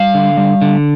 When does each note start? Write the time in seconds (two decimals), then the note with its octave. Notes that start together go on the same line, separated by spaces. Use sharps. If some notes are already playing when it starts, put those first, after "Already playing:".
Already playing: G3 F5
0.14 D3
0.37 G3
0.62 D3